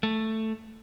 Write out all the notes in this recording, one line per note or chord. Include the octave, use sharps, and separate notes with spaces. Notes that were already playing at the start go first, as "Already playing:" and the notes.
A3